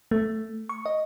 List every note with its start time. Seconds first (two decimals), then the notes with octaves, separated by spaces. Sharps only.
0.11 A3
0.69 C#6
0.86 D#5